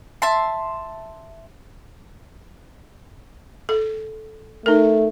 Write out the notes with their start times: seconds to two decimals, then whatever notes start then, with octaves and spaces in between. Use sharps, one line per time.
0.22 E5 A5 C6
3.69 A4
4.66 A3 D#4 A#4